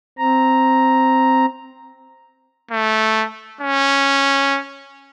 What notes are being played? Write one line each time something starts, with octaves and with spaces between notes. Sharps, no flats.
C4 A#5
A3
C#4